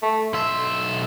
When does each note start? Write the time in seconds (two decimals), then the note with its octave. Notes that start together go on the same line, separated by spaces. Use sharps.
0.03 A3
0.33 B1 E5 C6